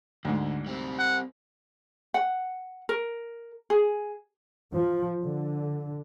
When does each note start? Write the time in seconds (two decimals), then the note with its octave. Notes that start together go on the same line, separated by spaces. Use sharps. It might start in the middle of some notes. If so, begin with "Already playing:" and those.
0.25 D2 G#2 D3
0.66 G3 C4
0.99 F#5
2.14 F#5
2.89 A#4
3.70 G#4
4.73 F3
5.24 D3